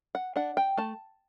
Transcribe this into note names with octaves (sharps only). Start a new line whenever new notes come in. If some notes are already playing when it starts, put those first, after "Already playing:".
F#5
D4 F#5
G5
A3 A5